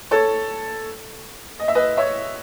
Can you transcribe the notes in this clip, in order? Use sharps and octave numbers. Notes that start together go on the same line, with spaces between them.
A4 C#5
D#5
E5
B4 D#5
C#5 E5